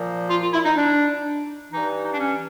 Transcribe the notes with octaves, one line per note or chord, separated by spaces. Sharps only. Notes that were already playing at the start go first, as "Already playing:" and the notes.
Already playing: A#2 F3
F4
F4
E4
D#4
D4
G2 E3 D#4
D#4
D4
C#4